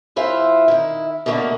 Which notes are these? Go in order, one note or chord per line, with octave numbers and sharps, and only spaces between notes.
E3 E4 F4 C5 E5
D#3 E4
B2 D3 A3 A#3 F#4